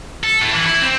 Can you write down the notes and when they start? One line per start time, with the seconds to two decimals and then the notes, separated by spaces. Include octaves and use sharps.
0.24 A4
0.41 A2
0.54 E3
0.66 E4
0.82 C4